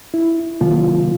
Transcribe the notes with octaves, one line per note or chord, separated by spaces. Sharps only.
E4
C3 D#3 F#3 A#3 F4